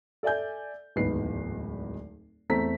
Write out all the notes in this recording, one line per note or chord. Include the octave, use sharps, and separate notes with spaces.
A4 D5 E5 G#5 G6
D1 G#1 E2 D#4 B4 C7
E2 A3 C4 A4 A#5 B6